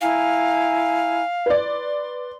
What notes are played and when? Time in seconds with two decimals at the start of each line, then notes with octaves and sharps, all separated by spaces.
0.01 E4 F5 G#5 A#5
1.46 B4 D5 C6